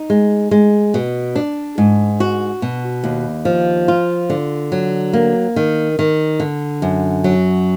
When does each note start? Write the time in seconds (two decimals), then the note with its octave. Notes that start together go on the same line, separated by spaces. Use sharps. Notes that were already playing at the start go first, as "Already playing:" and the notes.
Already playing: D#4
0.10 G#3
0.51 G#3
0.94 B2
1.36 D4
1.78 G#2
2.20 F#4
2.62 B2
3.04 D#2
3.45 F3
3.88 F4
4.30 D3
4.72 F#3
5.13 A#3
5.56 D#3
5.99 D#3
6.40 D3
6.82 F#2
7.24 F#3